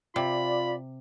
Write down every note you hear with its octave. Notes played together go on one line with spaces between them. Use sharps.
C3 F4 D5 B5